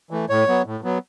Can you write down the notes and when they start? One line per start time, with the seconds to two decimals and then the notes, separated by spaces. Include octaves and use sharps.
0.11 E3 A3
0.29 A2 C#5
0.48 F#3 B3
0.66 A2
0.84 F#3 B3